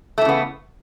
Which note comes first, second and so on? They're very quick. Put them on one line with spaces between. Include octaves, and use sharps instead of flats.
A3 E3 C#3 B3